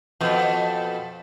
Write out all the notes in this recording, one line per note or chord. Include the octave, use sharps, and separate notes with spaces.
F2 B2